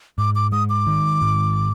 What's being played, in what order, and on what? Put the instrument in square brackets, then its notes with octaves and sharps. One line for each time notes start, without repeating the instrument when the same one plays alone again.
[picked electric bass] G#2 [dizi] D6
[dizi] D6
[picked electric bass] G#3 [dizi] D#6
[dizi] D6
[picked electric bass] D#3
G#2